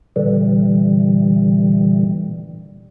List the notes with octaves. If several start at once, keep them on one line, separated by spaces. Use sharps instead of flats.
A#2 D3 E3 G3